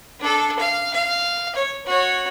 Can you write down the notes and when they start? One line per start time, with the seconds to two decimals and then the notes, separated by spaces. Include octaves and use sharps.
0.20 D4 A4
0.59 F5
0.94 F5
1.55 C#5
1.86 F#4 C#5